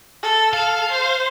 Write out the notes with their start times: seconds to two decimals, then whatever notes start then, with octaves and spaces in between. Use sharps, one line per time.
0.23 A4
0.53 A4 F5
0.91 C5